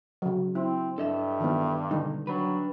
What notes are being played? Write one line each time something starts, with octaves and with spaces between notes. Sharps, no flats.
C#3 F#3
C4 E4
G2 D4 A4 D#5 E5
D#3 E3 B3
B2 D3 G3 D#4
F#3 D4 B4